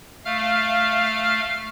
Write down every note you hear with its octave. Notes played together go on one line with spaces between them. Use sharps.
A3 F5 F6